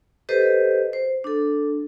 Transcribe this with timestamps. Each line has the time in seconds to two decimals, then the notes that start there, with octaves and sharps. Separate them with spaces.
0.29 G4 A4 B4 C5 D#5
0.93 C5
1.24 D4 A4